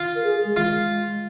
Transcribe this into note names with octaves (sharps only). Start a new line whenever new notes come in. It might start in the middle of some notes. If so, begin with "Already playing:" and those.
Already playing: F4
A#4
G#4
G#3
F4